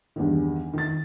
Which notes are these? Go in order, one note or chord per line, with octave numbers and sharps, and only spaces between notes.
E2 G2 D#3
D#3 A6